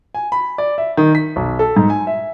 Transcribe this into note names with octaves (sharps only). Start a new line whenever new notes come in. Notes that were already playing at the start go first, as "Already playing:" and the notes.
G#5
B5
D5
E5
D#3
B6
B1
A4
G#2
G#5
E5